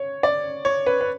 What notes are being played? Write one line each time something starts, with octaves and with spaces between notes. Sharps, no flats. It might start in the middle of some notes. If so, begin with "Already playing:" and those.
Already playing: C#5
D5
C#5
B4
B4